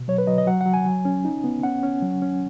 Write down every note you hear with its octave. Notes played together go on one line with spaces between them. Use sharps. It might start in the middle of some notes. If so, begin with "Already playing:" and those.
Already playing: B2
F#3 C#5
B4
F#3 D#5
D#5
F#3 F#5
F#5
F#3
G#5
F#3
C#4
D#4
B3
C#4 F#5
C#4
F#3
C#4